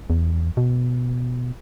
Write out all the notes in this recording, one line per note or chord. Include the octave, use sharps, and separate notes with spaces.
E2
B2